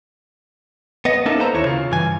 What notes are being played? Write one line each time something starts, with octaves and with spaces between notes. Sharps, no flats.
B3 D#5
A#3 C#4 D#4 A4 A#4 E5
A4 B4 C5 A#5
D#2 E4 C#5
C#3 F4
G2 E3 G#5